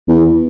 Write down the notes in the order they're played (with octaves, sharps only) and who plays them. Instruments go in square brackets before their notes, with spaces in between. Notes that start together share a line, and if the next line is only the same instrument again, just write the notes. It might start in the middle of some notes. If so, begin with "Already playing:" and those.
[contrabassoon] E2